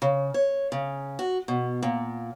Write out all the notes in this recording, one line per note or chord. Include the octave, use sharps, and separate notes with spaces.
C#3
C#5
C#3
F#4
B2
A#2